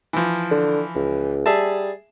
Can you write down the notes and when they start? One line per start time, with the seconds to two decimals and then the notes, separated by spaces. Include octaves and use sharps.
0.13 E3 F3
0.51 D3
0.95 C#2
1.46 G3 G#4 E5 A5